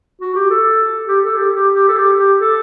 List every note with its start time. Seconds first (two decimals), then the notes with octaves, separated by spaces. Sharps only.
0.21 F#4
0.35 G4
0.50 A4
1.08 G4
1.24 A4
1.37 G4
1.53 G4
1.74 G4
1.88 A4
1.97 G4
2.18 G4
2.40 A4